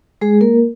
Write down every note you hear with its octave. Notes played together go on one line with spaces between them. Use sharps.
G#3 G#4
A#3 A#4